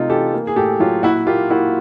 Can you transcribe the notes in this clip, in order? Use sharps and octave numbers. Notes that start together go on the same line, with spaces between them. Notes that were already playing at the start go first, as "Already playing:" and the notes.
Already playing: C3 A3 D#4 F4
E3 G4 A4
A#3
G#4
A2 G4 A4
F#3 F4 G4
A#2 E4 F#4
A#3 F4 G4
A#3 E4 F#4